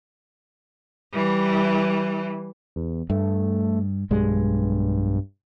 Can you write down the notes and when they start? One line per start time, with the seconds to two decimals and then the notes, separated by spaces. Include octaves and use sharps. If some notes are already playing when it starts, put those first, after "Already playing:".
1.13 E3 G3
2.76 E2
3.10 G2 A3
4.11 B1 G2 G#3